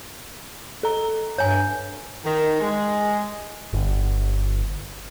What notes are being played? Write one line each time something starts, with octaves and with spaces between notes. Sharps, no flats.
A4 A#5
G2 C#5 G#5
D#3
G#3
G1